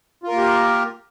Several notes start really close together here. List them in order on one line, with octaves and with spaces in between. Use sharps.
F4 A#4 A#3 G4